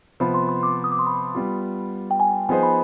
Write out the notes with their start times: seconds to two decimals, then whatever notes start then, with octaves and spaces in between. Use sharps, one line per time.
0.20 C3 F3 B3 B5
0.34 C6
0.49 C6
0.63 D6
0.84 D#6
0.92 D6
0.99 C6
1.07 B5
1.35 G3 B3 F4
2.11 G5
2.20 G#5
2.49 F3 B3 D#4 G#4 C5 G#5
2.63 B5